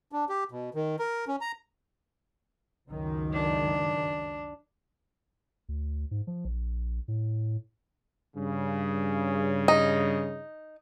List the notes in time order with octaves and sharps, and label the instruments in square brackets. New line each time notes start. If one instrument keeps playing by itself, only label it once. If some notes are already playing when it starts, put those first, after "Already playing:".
[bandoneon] D4
G4
B2
D#3
A#4
C#4
A#5
[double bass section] C#2 F#2 D#3
[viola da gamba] D4
[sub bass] D2
G#2
F3
A#1
A2
[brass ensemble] G2 C#3
[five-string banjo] D#4